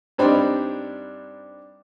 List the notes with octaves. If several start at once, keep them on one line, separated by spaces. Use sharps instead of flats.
G2 G3 C4 D4 D#4 B5